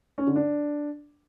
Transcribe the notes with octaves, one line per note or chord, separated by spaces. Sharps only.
C#4
D3
D4